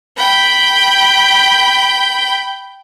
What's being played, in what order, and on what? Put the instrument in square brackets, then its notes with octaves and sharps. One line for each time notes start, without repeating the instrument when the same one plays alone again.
[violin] G5 B5